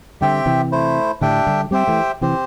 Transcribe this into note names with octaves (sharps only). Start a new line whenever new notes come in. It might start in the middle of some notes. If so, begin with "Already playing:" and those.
D3 G3 C4 G4 E5 G5
C3 E3
A3 E4 C5
A2 D3 D4 G4 E5 G5
D3 G3
G3 C4 G4 C5 E5 G5
E3 A3
C3 E3 C4 G4 C5